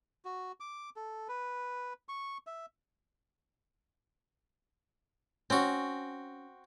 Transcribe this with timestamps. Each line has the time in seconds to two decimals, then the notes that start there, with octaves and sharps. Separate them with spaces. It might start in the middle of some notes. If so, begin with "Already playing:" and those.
0.25 F#4
0.60 D6
0.96 A4
1.28 B4
2.09 C#6
2.47 E5
5.50 C4 C#4 F#4